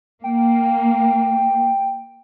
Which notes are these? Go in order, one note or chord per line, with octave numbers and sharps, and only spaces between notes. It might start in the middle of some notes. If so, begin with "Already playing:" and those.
A#3 G5